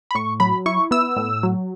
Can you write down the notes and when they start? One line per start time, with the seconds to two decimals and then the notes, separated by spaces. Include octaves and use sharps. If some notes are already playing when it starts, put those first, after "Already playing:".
0.11 B5
0.15 A2 C#6
0.40 F#3 B5
0.66 E4 C#6
0.91 B3 E6
1.17 A2
1.43 F#3